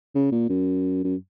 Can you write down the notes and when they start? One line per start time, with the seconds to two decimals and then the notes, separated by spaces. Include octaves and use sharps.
0.15 C#3
0.32 A#2
0.49 F#2
1.04 F#2